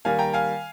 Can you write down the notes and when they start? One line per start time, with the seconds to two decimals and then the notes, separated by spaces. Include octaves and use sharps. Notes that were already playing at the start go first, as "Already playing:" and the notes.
0.05 D#3 G3 A#3 F5 G#5
0.19 G5 A#5
0.34 F5 G#5